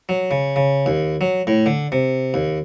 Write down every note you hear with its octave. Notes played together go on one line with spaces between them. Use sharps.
F#3
C#3
C#3
D#2
F#3
A2
D3
C3
D#2